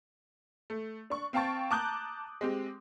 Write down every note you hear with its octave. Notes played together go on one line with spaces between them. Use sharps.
A3
D4 C#6
C4 F5 G5 A5 C#6 A6
A5 A#5 D6 D#6 F#6 G6
G#3 C4 G4